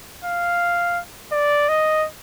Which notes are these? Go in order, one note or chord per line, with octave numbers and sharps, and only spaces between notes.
F5
D5
D#5